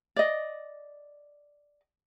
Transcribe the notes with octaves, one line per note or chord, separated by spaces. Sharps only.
D5 D#5